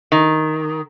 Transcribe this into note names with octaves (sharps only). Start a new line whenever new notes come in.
D#3